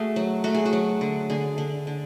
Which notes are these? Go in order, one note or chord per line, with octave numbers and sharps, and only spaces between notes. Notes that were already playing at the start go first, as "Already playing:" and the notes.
Already playing: A3 F#4 G#4
F#3
A3 F#4
G#4
F#4
F#3
D3
D3 G#4
D3
D3